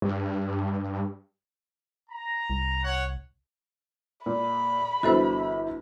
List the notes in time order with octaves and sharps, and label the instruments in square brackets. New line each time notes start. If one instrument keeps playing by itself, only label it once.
[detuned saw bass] G2
[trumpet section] A#5
[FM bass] C2
[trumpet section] C#5 F#5
[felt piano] A#2 [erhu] B5
[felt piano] G1 E3 E6 [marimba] F#4 A4 C5